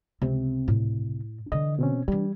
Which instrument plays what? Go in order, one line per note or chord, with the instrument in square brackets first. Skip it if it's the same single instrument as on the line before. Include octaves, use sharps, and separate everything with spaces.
[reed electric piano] C#2 C3 [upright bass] C4
[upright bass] A2
[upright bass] D3 E3 [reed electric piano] D#5
[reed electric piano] B2 C4 C#4
[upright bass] E3 D4 [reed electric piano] G3